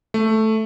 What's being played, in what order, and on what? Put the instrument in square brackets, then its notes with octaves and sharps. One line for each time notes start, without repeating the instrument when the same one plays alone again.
[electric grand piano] A3